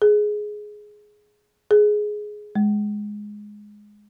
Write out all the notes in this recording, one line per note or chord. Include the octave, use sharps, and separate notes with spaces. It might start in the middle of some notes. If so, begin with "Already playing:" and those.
G#4
G#4
G#3